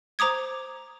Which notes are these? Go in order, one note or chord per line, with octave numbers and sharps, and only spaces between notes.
C5 A#5 D6 D#6 G#6